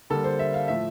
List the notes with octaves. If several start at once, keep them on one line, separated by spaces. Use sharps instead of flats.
D3 G3 A#3 A4
C5
E5
F5
A2 F3 A3 E5